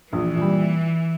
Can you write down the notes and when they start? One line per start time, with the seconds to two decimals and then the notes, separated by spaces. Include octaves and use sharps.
0.12 A#1 E3
0.36 A#2
0.41 G3